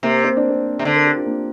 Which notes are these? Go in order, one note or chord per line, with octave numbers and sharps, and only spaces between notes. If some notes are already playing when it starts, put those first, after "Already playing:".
C3 A#3
C4
D4
C4
C3
D3 C5
A#4
G4
F4
A#3 D4